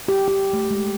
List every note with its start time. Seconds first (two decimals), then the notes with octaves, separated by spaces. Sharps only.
0.08 G4
0.28 G4
0.53 A3
0.71 G#3